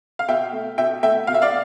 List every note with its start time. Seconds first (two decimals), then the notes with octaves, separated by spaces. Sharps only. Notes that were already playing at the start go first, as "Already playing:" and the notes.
0.19 F5
0.28 B2 E5 G5
0.53 A3
0.78 B2 E5 G5
1.03 A3 E5 G5
1.27 B2 F5
1.34 E5
1.42 D5 F5